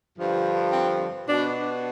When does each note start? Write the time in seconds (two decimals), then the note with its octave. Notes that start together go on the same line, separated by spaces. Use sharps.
0.18 G2 D3 F3
0.73 C4
1.28 B2 D4